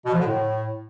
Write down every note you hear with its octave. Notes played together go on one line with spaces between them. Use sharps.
B2
F3
D3
A2